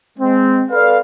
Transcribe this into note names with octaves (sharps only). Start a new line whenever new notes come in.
G#3 C4
A4 B4 D5 F5